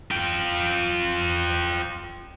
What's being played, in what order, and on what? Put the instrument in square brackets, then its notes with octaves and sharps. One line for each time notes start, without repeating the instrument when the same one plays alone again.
[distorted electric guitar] F4 G5